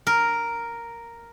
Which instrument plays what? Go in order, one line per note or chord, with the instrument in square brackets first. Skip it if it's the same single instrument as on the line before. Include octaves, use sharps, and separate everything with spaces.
[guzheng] A#4